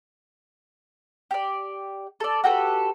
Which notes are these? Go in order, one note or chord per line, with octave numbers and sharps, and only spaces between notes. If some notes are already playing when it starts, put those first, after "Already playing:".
G4 D5
A4 D5
F#4 G4 A4 B4